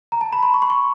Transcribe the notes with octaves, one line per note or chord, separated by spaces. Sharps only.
A#5
A5
B5
C6
C#6
C6
C#6